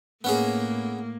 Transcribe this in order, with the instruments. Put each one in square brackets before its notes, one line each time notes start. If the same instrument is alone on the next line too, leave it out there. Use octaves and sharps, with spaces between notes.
[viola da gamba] A2 A#3 [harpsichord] B3 C#4 G#4